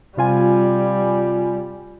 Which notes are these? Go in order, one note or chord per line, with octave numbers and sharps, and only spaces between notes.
C3 G3 F4 G#5